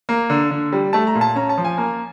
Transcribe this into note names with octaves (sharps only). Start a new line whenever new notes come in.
A#3
D3
D3
G3
A3 A5
A#5
A#2
A5
C#4 A#5
A5
F3
G#5
A#3